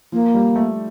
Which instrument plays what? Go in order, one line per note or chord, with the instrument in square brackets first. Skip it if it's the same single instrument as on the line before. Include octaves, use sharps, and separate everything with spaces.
[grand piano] F3 [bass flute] A#3
[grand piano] G3
A3